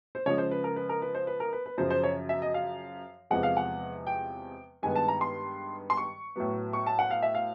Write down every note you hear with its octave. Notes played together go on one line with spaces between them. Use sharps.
C5
C#3 F3 G#3 C#5
C5
B4
A#4
B4
A#4
B4
C5
B4
A#4
B4
B4
F#2 C#3 F3 C5
C5
C#5
E5
D#5
F5
E2 C3 F3 G#3 F#5
F5
F#5
G5
G2 D#3 G#3 B3 G#5
A5
A#5
C6
C6
C#6
A2 F#3 B3
C#6
A5
F#5
F5
E5
F5